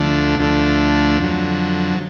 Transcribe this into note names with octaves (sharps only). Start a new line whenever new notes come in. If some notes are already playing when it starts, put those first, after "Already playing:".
Already playing: D2 D3 F3 A3 D4
D2 D3 F3 A3 D4
F2 D3 F#3